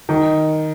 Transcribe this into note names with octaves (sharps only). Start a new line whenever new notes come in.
D#3